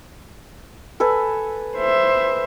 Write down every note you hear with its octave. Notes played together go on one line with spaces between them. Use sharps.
A4 B4 G#5
C5 E5